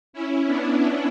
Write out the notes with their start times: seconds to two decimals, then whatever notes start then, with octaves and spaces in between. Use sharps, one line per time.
0.13 C#4 E4
0.46 B3 D4